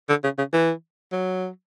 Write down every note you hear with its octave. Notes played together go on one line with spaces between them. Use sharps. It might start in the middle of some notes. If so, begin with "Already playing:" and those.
D3
C#3
C#3
E3
F#3